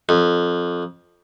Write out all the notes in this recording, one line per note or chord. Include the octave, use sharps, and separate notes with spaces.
F2